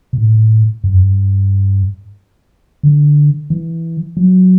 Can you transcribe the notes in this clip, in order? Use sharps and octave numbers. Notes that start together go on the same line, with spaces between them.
B2
A2
G2
F#2
G2
D3
E3
F#3